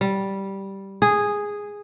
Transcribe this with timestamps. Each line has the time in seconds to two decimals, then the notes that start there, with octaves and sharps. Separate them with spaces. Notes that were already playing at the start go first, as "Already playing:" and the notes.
0.01 G3
1.02 G#4